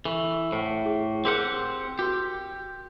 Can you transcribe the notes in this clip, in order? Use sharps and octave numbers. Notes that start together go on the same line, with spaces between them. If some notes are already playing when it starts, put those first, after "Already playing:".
E3 A4 C#6
A2 C5 F#5
G#4
C4 G4 G#4 A#4 F#5 A5
F#4 G4 A#4 C6